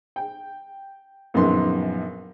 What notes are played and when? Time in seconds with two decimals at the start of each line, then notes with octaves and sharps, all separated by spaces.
0.16 G5
1.34 A#1 F#2 D#3 B3 C6